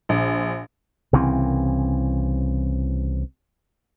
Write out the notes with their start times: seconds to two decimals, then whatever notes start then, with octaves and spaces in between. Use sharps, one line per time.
0.09 A#1
1.13 C2 C#3 E3 C4